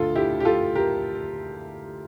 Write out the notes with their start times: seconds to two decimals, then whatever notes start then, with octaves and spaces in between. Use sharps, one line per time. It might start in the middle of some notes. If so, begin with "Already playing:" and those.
Already playing: D2 D3 F4 A4
0.15 E4 G4
0.40 G4
0.45 F4 A4
0.75 G4 A#4